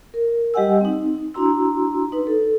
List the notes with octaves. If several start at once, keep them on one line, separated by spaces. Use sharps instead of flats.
A#4
G3 G4 D#5 F#5 G#5 E6
C4 D#4
D4 E4 F#4 A#5 C6 E6
D#4 B4
A4